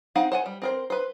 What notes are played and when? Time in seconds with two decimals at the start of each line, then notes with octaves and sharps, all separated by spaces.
0.15 C4 D#4 F5 F#5
0.32 C5 F#5 G#5
0.46 G3
0.62 C4 A#4 C5
0.90 B4 C5